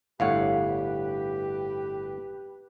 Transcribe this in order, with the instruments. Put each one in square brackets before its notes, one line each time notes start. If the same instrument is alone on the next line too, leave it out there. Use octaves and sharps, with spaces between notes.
[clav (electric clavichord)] G1 A2 C#5 [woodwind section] G4 B4 [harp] F5 F#5